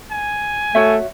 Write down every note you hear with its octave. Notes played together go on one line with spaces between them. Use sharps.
G#5
A3 F#4 C#5 E5